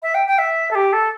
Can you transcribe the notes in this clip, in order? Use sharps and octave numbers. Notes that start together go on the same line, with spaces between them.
E5
G5
G5
E5
A4
G4
A4